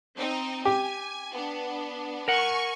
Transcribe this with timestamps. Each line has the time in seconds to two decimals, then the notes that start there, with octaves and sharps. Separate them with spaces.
0.18 C4 D#4
0.65 G4 G#5
1.32 B3 D4
2.28 A#4 F#5 G#5 C#6